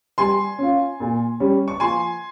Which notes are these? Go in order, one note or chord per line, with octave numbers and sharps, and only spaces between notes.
G3 G#5 C6
C#4 F4
A#2
G3 C#4
C#6
F3 G#5 C6